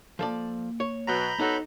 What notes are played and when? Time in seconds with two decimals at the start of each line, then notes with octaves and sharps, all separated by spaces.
0.19 F3 A#3 A4 D5
0.80 C#5
1.07 B2 F#3 A#5 B5 G6
1.40 B3 D#4 F#4 A4 C#5